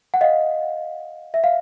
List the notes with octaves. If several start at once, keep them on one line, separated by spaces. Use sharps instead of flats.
F#5
D#5 F5
E5
F5